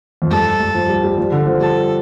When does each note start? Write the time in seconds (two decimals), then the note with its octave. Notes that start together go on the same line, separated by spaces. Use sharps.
0.22 F2
0.31 G2 A4
0.60 G2
0.74 F3
0.89 G3
1.04 G3
1.18 F3
1.32 D3
1.46 F3
1.60 G3 A4